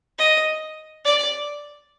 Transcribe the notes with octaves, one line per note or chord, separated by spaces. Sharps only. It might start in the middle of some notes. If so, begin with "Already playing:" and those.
D#5
D5